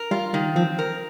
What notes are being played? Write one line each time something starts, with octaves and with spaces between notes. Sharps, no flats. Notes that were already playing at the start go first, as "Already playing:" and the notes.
Already playing: A#4
G3 F4
D#3 G3
F3 C4
A#4